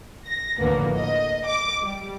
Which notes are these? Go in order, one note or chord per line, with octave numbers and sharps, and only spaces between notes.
A#6
D2 A2 D3 F3 A#3 B3
D#5
D6
G3